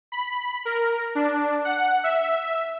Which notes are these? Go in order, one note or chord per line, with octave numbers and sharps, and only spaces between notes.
B5
A#4
D4
F#5
E5